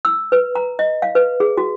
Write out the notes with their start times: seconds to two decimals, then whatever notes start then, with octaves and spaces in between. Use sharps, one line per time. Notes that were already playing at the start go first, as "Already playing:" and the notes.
0.05 E6
0.32 B4
0.55 A#5
0.79 D#5
1.02 F5
1.15 B4
1.40 G#4
1.58 F#4